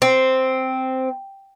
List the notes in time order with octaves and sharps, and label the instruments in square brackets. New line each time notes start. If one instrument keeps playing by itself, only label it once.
[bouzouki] C4